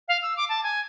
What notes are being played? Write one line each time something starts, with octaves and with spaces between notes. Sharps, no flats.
F5
E6
D6
A5
G#5